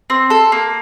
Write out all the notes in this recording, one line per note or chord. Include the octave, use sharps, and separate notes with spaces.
C4
A4
A#3